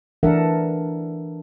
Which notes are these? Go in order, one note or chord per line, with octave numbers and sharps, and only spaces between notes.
E3 D4 A4 A#4 E5 F#5